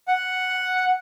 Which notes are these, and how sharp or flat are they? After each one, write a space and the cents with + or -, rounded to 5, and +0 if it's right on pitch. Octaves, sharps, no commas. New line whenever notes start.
F#5 +0